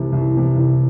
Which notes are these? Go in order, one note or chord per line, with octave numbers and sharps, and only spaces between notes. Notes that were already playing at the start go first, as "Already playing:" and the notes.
Already playing: C2 C3 E3
C2
C3 E3
C2